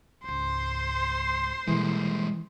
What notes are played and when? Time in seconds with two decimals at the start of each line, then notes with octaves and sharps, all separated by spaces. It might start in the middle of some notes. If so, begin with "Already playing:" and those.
0.24 C#2 G#2 C5 C6
1.68 B2 E3 G3 G#3 A#3